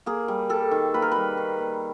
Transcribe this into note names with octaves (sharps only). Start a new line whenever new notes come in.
A#3 G#4
G3
G3 A4
D#3
A#3 B4
A#4
G3 B4
D#3
A#3